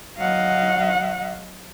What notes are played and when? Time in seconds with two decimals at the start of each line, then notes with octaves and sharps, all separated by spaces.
0.18 F#3 D#5 F5 F#5